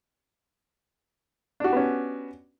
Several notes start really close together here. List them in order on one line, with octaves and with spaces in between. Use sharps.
D4 F#4 G4 B3 C#4